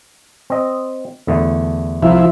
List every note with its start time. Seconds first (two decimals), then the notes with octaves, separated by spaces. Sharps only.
0.50 C4 D#5
1.27 E2 D3 A3
2.02 C2 F3 E4